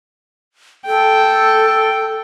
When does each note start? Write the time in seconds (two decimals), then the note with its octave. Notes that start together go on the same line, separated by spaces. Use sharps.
0.86 A4 G5